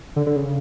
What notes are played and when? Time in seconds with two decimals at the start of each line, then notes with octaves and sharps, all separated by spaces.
0.16 D3
0.26 D3
0.36 C#3